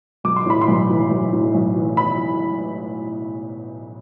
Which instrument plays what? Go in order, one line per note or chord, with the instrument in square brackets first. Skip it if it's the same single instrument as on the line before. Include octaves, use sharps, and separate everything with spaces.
[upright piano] B1 D6
C6
A2 B5
C6
B1
E3
B1
A2
B1
E3
B5